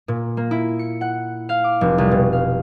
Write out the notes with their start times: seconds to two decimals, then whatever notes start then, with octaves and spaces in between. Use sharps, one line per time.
0.08 A#2
0.37 A#3
0.51 E4
0.79 C#7
1.01 F#5
1.49 F5
1.64 D6
1.81 F1
1.98 C2
2.11 B2
2.33 F5